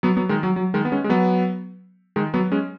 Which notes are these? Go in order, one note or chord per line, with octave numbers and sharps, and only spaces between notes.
F#3 B3
F#3 B3
D#3 G#3
F#3
F#3
D#3 G#3
B3
G#3 C#4
G#3
F#3 B3
D#3 G#3
F#3 B3
G#3 C#4